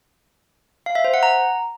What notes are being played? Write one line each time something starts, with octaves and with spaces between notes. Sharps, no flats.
F5
E5
C5
F#5
A#5